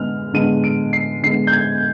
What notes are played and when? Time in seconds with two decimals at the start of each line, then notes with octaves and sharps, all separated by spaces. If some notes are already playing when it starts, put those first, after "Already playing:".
Already playing: D3 G#3 B3 F6
0.33 D3 G#3 B3 D#7
0.64 D7
0.93 C7
1.23 D3 G#3 B3 C7
1.47 G6
1.53 G#6